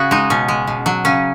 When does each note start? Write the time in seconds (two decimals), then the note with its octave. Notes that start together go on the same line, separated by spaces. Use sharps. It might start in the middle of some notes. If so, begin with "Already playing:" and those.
Already playing: C#3 F#4 G#4
0.11 G#3 D#4
0.30 B2 C#4
0.48 G#3
0.67 B2
0.86 F#3
1.05 C#3 C#4